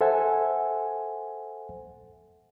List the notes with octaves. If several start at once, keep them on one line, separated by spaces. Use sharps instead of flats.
A4 C5 E5 F#5 G#5